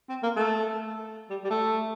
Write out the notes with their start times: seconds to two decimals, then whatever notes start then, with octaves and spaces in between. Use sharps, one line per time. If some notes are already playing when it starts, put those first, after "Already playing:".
0.09 C4
0.23 A#3
0.36 A3
1.30 G3
1.44 G3
1.50 A3